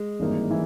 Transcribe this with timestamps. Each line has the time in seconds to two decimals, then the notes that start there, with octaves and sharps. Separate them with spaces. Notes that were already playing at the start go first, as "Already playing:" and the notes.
Already playing: G#3
0.20 G#1 G2 E3 A#3 D#4
0.51 E3